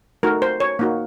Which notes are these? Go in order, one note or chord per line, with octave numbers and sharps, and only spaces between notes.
A3 D#4 F#4 A#4
C5
C#5
A#3 D#4 F#4